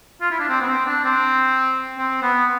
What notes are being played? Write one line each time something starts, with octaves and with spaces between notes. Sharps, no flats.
F4
E4
D4
C4
B3
C4
D4
C4
C4
B3